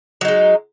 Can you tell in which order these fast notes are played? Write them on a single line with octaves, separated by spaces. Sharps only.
F#3 D#4 G#3